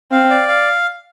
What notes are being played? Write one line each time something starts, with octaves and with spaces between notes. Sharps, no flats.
C4 F5
D5
F5